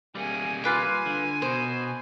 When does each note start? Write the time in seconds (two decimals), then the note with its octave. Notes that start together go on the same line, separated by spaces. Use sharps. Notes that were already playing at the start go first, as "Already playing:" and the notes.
0.15 G3 A#3 G#4 G#5
0.64 F4 B4 G#5 D6
1.06 D3
1.42 B2 C5